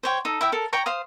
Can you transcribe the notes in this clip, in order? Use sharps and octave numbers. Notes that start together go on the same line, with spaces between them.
C5 C#5 G5
D#4 A4
E4 E5 G5
A4 A#4
C#5 G5 A#5 C#6
C5 F5 D#6